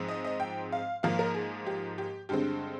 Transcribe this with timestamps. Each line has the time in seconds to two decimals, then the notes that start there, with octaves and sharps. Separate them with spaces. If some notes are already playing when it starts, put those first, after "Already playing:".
Already playing: G#2 F3 G#3 C4
0.08 D#5
0.24 D#5
0.40 G5
0.72 F5
1.03 G#2 F3 A#3 F5
1.19 A#4
1.35 G#4
1.66 G4
1.98 G4
2.29 G2 D3 G#3 C4 G4